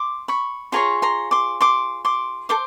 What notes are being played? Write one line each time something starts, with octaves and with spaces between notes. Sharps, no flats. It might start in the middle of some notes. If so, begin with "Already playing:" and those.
Already playing: C6 D6
B5 C#6
F4 G#4 C#5 A#5 C6
A#5 C6
C6 D6
C6 D6
C6 D6
A4 C5 C6 D6